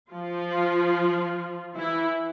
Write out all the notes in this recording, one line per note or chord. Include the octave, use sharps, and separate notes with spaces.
F3 F4
E3 E4